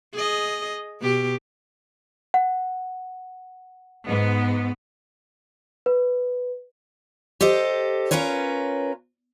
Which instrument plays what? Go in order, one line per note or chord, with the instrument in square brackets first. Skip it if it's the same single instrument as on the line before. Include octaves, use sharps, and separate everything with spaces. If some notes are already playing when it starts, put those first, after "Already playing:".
[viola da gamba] G#4 D#5
B2 G4
[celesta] F#5
[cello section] G#2 B3
[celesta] B4
[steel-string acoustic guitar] G4 A4 C5 D#5
C#4 F4 A#4 B4 C#5